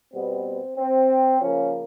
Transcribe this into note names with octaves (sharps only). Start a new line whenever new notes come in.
B2 G3 B3 C4
C4
C#3 F3 A#3 C#4